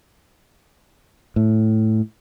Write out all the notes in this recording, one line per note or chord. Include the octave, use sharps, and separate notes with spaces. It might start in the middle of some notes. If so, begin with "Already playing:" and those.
A2